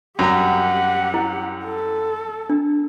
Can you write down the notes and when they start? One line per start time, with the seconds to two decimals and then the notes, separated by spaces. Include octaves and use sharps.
0.19 F#2 G3 G4 F#5 A#5
1.14 E4
1.64 A4
2.50 D4